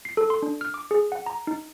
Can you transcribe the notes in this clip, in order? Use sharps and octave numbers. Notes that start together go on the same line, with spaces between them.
C7
A4
C6
D4
F6
D6
G#4
F#5
A#5
D#4